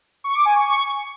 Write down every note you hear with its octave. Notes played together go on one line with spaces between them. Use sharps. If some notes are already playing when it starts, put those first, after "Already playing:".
C#6
D6
G#5
C#6